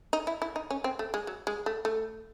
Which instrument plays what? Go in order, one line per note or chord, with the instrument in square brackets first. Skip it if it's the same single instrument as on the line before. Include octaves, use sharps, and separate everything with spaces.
[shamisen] D#4
E4
E4
D#4
C#4
C4
A3
G#3
F#3
G#3
A3
A3